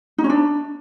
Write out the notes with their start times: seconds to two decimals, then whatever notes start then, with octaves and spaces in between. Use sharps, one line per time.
0.18 D#4
0.24 C#4
0.30 D4